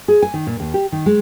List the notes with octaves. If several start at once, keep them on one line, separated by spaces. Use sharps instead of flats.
G#4
G#5
D#3
A#2
D#2
G4
D#3
G#3